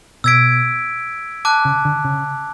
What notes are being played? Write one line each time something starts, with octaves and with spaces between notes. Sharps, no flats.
B2 E6 G#6 B6 D7
A5 D6 F#6
C#3
D3
C#3